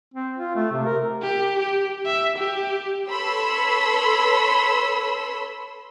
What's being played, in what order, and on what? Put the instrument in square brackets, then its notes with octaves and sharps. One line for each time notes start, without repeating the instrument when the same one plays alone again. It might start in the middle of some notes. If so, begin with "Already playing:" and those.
[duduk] C4
F4
A3
C3
A#4
[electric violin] G4
G4
E5
G4
[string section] A4 B4 C#5 B5 C6 E6